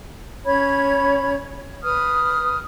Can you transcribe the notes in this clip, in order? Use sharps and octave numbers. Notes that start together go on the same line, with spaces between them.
C#4 C#5 B5 G#6
B4 D#6 F6